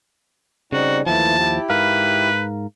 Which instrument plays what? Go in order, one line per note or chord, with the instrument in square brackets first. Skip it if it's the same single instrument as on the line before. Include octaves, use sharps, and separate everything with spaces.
[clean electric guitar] C#3 [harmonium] G3 C4 D#4 [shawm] F#4
[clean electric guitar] D#2 F3 [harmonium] E3 A3 E4 [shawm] A5
[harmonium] E4 G4
[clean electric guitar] G#2 A#4 F5 [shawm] B4